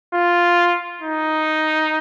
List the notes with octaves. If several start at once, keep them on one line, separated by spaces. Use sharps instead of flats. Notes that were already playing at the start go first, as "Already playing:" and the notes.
F4
D#4